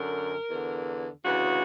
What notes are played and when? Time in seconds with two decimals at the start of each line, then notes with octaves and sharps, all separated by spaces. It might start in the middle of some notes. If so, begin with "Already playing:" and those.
Already playing: F#2 D3 A#4
0.50 E2 D3
1.25 D2 C#3 E3 F#4